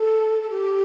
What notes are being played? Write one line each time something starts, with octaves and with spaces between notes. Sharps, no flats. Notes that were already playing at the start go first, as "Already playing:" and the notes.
Already playing: A4
A4
G4